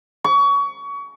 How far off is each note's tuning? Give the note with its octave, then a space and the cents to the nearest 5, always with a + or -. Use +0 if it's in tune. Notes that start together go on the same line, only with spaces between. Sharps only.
C#6 +25